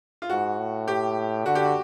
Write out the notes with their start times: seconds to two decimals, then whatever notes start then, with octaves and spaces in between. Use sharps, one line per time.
0.22 F4
0.29 G#2 F#4
0.59 A2
0.88 G4
1.46 D3 F#4
1.55 G4
1.65 F#4